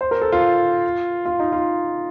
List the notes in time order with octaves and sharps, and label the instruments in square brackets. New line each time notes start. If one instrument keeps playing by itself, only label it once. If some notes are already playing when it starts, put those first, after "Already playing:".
[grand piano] C5
A#4
A4
F4
F4
D#4
F4